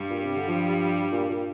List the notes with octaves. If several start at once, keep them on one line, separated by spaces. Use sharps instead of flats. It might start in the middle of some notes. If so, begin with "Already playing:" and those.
Already playing: G2 G3
A#2
C3
D3
F3
A#2
A#2